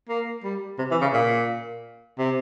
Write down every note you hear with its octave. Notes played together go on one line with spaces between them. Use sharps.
A#3
G3
C3
E3
C#3
A#2
C3